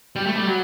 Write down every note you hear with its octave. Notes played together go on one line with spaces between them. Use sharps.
G3
A3
G3
F#3